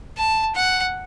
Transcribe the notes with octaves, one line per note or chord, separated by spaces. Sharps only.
A5
F#5